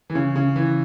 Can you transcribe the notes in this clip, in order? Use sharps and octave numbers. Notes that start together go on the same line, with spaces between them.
E3
C#3
C#3
E3